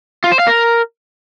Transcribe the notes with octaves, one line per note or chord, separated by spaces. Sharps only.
F4
C5
F5
A#4